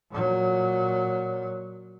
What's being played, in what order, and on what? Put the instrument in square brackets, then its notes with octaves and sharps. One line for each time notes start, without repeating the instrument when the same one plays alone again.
[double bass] A#2 F#3